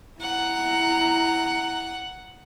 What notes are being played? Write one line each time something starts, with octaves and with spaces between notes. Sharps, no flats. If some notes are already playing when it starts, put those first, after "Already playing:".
E4 F#5 A#5